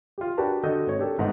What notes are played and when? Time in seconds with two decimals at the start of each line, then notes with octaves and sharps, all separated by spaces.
0.18 F4 G4
0.38 D4 F#4 G4 A#4 B4 A5
0.63 D3 F#4 A4 D#5 G6
0.87 G#1 C#5
0.99 D4 G4 A4 A#4
1.18 G1 G#2 D#4 F#5